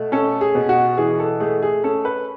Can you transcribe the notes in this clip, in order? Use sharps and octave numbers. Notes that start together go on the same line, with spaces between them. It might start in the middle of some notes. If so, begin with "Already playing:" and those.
Already playing: B2 A3
C#4 A4
G#4
B2
F#4
E3 G#4
A4
A3 G#4
G#4
C#4 A4
B4